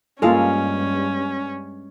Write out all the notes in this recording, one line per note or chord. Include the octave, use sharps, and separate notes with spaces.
G2 G#3 A#3 C#4 F4 A4 F5